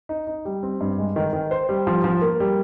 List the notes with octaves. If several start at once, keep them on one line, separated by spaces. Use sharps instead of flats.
D#4
D#4
G3
C4
G2
G#3
D#3
D#3
C5
G3
F3
F3
A#3
G3